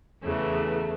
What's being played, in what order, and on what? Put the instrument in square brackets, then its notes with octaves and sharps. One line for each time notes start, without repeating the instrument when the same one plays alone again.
[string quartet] E2 C#3 E3 A3